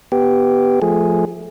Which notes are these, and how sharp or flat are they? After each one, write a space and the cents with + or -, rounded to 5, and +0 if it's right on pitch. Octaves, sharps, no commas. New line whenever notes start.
B3 +0 G4 +0
F3 +0 A3 -10 G#4 +0